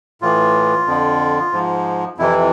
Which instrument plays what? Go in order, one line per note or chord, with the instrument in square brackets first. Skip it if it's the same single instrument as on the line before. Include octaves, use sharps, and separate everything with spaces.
[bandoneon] A2 E3 F4
F2 D3 F3
G#2 F3
F2 C3 E3 E4